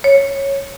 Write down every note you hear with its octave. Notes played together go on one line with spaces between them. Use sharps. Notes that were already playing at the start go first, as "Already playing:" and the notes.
C#5